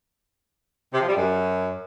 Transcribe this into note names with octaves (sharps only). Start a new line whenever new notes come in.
C3
F3
G3
F#2